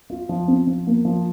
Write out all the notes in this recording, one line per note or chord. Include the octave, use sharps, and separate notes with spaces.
F4
F3
C4
F3
A#3
F3